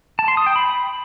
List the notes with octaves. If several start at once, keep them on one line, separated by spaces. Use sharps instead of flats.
A5
C6
D#6
G5
B5